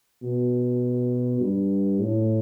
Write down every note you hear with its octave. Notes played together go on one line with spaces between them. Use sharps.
B2
G2
A2